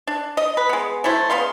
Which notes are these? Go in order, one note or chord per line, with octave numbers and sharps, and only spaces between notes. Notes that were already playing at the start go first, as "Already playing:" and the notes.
D4
D#5
B4
G#3 B3
F#3 A3 E4 C5
C#3 B3 F5 C6